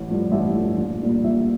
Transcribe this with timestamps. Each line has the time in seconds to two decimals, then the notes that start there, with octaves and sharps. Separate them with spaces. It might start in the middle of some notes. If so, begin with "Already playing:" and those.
Already playing: A1
0.08 G2 F3 A3
0.31 A1 E5
0.54 G2 F3 A3
0.77 A#1
1.01 A#2 G3 A#3
1.24 A#1 E5